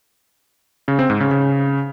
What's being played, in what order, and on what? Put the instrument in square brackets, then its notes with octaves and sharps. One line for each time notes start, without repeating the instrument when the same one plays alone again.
[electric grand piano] C#3
C4
G#2
C#3
C#3